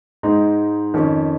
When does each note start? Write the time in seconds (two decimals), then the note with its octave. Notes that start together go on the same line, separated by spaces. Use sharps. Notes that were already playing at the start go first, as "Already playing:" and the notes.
0.23 G#2 G#3 D#4
0.94 F2 D#3 C#4